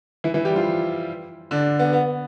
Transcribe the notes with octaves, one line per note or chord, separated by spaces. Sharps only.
E3 E4
E3 E4
G3 G4
F3 F4
D3 D4
B3
B3